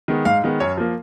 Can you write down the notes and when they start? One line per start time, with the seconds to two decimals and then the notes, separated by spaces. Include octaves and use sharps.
0.08 D#3 G#3 B3
0.25 G#2 F5
0.44 D#3 G#3 B3
0.60 F#2 C#5
0.77 F3 A#3